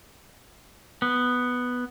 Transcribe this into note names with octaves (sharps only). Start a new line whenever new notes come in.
B3